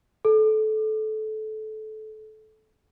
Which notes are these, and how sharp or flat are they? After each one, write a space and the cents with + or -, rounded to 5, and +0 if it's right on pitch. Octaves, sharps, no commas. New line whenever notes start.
A4 -20